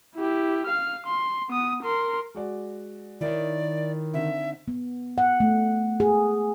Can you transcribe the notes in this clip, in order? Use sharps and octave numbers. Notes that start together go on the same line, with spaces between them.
E4 G4
F5 F6
C6
B3 D#6
A#4 C6
G#3 F#4 D5
D#3 E4 C#5 D5
D3 C4 D#4 E5
B3
F#5
A3
G#4